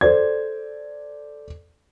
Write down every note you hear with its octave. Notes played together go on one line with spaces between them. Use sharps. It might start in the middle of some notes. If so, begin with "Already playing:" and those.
A4 C5 D5 G#6